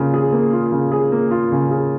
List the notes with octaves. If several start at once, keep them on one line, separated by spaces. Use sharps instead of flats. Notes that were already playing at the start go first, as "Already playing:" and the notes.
Already playing: C#3 A#3 F4
G#4
A#3
F4
C#3
G#4
A#3
F4
C#3
G#4